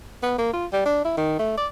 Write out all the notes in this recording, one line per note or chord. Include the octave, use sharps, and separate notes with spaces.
B3
A#3
F4
G3
D4
E4
D#3
A3
D5